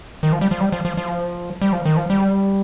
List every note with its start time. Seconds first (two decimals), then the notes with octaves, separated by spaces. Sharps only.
0.23 D#3
0.32 F3
0.41 G3
0.51 F3
0.61 G3
0.72 F3
0.85 F3
0.97 F3
1.62 G3
1.73 F3
1.85 D#3
1.97 F3
2.10 G3